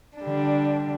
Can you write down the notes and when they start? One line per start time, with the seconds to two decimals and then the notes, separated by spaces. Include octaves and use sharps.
0.19 D3 G3 D4